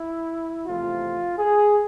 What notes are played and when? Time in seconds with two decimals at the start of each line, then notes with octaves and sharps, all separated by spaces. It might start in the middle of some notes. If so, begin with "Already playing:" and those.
Already playing: E4
0.66 E2 C3 F3 A3 F4
1.38 G#4